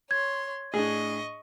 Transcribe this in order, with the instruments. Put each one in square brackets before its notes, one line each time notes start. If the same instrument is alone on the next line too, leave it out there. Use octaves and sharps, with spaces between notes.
[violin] C#5 C6 [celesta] G#6
[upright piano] A2 D4 [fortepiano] G#4 [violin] D#5 C#6